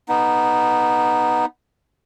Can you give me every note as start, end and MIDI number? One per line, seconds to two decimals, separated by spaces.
0.09 1.45 59
0.09 1.45 63